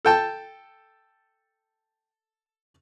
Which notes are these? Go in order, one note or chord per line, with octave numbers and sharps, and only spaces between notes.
A4 G5 A5